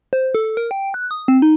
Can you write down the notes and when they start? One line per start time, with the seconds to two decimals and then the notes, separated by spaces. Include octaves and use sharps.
0.13 C5
0.35 A4
0.57 A#4
0.71 G5
0.94 F#6
1.11 D#6
1.28 C4
1.42 D#4